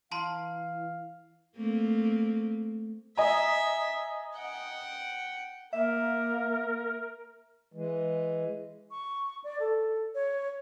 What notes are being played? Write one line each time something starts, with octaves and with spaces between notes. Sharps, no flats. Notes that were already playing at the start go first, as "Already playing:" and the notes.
E3 F5 A5 A#5 C6
A3 A#3 C4
D#5 E5 G#5 A#5
F#5 G5
A#3 A#4 E5
E3 G#3
C#6
D5
A4
C#5